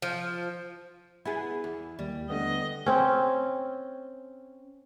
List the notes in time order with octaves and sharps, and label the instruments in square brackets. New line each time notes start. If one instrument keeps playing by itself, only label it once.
[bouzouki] F3
[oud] B3 G#4 [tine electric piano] E4
[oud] E2
[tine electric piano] D#2 [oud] G3
[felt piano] D3 A3 [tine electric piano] B3 [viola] D#5
[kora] C4 C#4